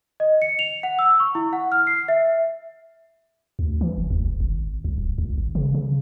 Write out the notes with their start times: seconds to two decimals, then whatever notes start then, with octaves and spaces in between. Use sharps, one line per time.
0.20 D#5
0.42 C#7
0.59 F7
0.83 F#5
0.99 E6
1.20 C#6
1.35 E4
1.53 F#5
1.72 F6
1.87 C7
2.08 E5
3.59 D2
3.81 E3
3.98 F1
4.10 D2
4.25 E1
4.40 G#1
4.85 C2
4.98 D1
5.18 C#2
5.38 G#1
5.55 C#3
5.74 C#3